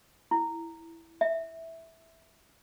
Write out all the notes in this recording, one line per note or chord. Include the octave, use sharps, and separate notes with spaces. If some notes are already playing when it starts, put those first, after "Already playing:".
E4
E5